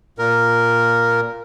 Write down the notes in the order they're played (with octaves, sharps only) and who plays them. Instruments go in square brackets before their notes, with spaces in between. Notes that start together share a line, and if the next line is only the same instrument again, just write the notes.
[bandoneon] A#2 A#4